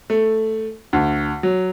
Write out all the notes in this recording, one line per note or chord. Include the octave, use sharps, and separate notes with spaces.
A3
D2
F#3